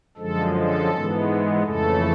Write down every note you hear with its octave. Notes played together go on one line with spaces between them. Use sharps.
F#2 D3 F3 G#3 A4
A4
G#2 E3 G#3 B3
F2 C#3 E3 A3 A4